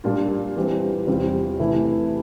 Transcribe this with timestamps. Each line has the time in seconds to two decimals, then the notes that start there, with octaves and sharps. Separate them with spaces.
0.04 A#2 G3 A#3 D4 F4
0.56 E3 G3 C4
1.07 E2 C3 G3 C4 F4
1.59 C3 E3 A3 E4